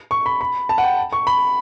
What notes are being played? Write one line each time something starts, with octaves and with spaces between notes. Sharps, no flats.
C#6
B5
B5
A5
F#5
G5
C#6
B5